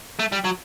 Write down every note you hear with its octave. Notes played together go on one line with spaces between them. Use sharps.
A3
G3
F#3